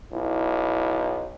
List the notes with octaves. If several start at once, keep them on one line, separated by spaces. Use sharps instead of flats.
B1 E4